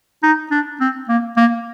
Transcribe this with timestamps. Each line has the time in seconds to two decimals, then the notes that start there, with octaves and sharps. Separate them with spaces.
0.23 D#4
0.51 D4
0.80 C4
1.09 A#3
1.37 A#3